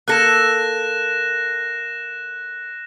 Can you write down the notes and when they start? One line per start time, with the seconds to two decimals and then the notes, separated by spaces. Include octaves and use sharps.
0.08 A#3 A4 F#6 A#6 E7